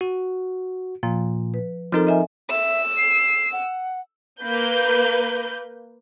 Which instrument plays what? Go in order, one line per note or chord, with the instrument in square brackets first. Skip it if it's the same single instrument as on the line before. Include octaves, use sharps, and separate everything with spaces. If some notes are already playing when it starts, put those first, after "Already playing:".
[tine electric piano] F#4
[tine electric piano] A#2 [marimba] F3
[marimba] B4
[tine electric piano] F3 D#4 A#4 [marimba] C4 A4
[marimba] D#5 E5 G#5
[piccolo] E5 [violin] E6
[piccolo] C7
F#5
[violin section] A#3 B4 G6